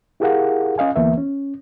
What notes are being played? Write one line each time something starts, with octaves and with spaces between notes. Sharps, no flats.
E4 G4 G#4 A#4 F5 F#5
C#4 D#5 F5 G#5
D2 E3 A#3 B3 E5
C#4